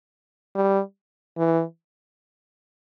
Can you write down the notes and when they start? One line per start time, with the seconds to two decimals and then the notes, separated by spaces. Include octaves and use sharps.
0.55 G3
1.37 E3